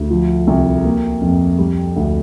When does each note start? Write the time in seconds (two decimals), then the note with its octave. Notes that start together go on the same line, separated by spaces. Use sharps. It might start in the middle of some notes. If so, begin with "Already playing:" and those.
Already playing: D2
0.10 F3
0.47 C2
0.85 A#3
1.21 F2
1.58 G3
1.96 D2